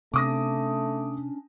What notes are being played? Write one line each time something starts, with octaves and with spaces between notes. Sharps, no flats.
C3 A3 C#4 D4 D6 D#6 A#6